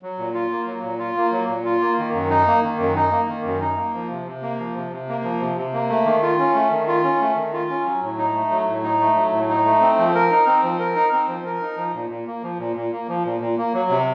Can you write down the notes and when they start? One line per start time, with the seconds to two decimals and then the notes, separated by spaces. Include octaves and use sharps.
0.02 F#3
0.19 A#2
0.34 F4
0.51 A#3
0.67 F#3
0.83 A#2
0.99 F4
1.17 A#3
1.32 F#3
1.49 A#2
1.65 F4
1.81 A#3
1.98 D#3
2.13 F#2
2.30 D#4
2.47 A#3
2.63 D#3
2.80 F#2
2.96 D#4
3.11 A#3
3.28 D#3
3.45 F#2
3.61 D#4
3.77 A#3
3.94 F3
4.11 C3
4.26 C3
4.42 A#3
4.59 F3
4.76 C3
4.91 C3
5.09 A#3
5.24 F3
5.41 C3
5.57 C3
5.73 A#3
5.90 A3
6.05 D#3
6.22 F4
6.38 C#4
6.55 A3
6.71 D#3
6.88 F4
7.04 C#4
7.21 A3
7.36 D#3
7.53 F4
7.70 C#4
7.86 F#3
8.02 A2
8.18 D#4
8.34 A3
8.51 F#3
8.68 A2
8.84 D#4
9.01 A3
9.16 F#3
9.32 A2
9.49 D#4
9.65 A3
9.81 C4
9.99 F3
10.15 A#4
10.31 D#4
10.47 C4
10.64 F3
10.79 A#4
10.96 D#4
11.13 C4
11.28 F3
11.46 A#4
11.62 D#4
11.77 F3
11.95 A#2
12.10 A#2
12.27 A#3
12.43 F3
12.59 A#2
12.76 A#2
12.92 A#3
13.08 F3
13.25 A#2
13.41 A#2
13.58 A#3
13.74 F#3
13.90 C3